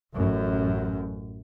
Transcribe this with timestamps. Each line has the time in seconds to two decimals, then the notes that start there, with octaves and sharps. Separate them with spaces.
0.15 A1 F#2